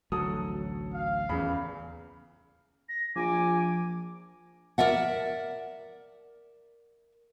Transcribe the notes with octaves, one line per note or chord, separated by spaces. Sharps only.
A1 D2 F#3 A4 D#6
F5
D#1 E2 C#3 B5
A#6
A#1 F3 G#5 D6
A#4 D5 E5 F#5